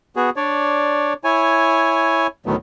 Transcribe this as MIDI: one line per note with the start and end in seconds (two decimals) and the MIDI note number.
0.16 0.30 59
0.16 0.30 66
0.16 0.30 68
0.36 1.13 62
0.36 1.13 73
0.36 1.13 74
1.24 2.27 64
1.24 2.27 73
1.24 2.27 80
2.46 2.56 38
2.46 2.56 45
2.46 2.56 51
2.46 2.56 54
2.46 2.56 57
2.46 2.56 59